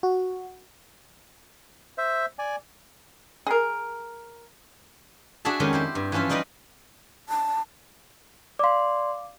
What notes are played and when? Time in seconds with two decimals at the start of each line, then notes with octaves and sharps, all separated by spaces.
0.03 F#4
1.98 C5 E5
2.39 D5 G#5
3.47 G#4 A#4
5.45 D4 F#4 G#4 E5 A5
5.60 F2 D#3 G#3 C#4 G4 D#5
5.73 E4 G4 C5
5.95 G2
6.12 E3 F3 C#4 F4 E5
6.29 G3 D#4 B4 D5 D#5
7.29 A5
8.59 D5 F5 C6 D6